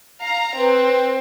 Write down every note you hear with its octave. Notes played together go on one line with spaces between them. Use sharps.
F5 A#5
C4 B4